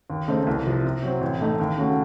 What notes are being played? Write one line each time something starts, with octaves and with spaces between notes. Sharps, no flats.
D#2
C#3 A3 C4 D#4
C2
C3 F3
C3
F#3 C4
A1
A2 A3 D#4
D#2
C#3 A3 C#4 F#4